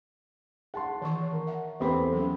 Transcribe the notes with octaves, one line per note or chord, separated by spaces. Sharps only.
G#4 F#5 A5 C6
D#3 E3 C#6
A#4
E5 F#5
E2 C4 G4 A4 B4 B5
F#3 C#4